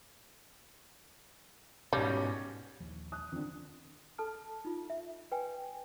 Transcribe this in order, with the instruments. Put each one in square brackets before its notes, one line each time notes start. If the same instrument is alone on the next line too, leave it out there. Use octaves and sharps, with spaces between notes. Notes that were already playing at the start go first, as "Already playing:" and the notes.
[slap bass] G#2 B2 [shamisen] G3 [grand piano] C#4
[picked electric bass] A#1 D#2 F3
[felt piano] D#6 F#6
[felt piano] F2 D3 [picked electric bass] D#3
[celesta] A4 A5 F6
D#4 F4
E5
B4 G5 G#5